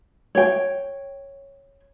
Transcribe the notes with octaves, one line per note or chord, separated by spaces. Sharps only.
C#5 G5